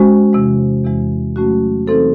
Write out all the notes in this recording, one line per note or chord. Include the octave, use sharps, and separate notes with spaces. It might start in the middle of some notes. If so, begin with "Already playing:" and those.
Already playing: G#3 C#4 F#4 C5
E2 C3 E3 G#3
E2 C3 E3 G#3
F#3 A3 C#4 F#4
E3 C4 D#4 A4 C5